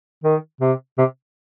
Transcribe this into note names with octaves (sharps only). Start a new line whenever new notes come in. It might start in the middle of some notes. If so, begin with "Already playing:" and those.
D#3
C3
C3